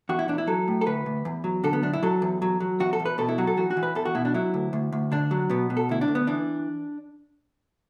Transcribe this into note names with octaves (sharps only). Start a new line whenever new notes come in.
E2 F#4
E4
E2 D4
E4
F#3 A4
A2
A4
D2 B4
D2
E2
F#3
D3 A4
B3
F#2 D4
E4
F#3 A4
E2
F#3
F#3
E2 F#4
A4
E2
B4
B2 A4
E4
F#3 F#4
A4
E3 F#4
F#4
E3
B4
E2 A4
F#4
B2 E4
D4
F#3 E4
D2
D2
D2
D3 D4
F#3
B2 B3
B2
A4
D2 E4
D4
D2
B3
E3 D4